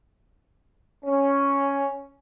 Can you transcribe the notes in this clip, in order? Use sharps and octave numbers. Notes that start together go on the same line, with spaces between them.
C#4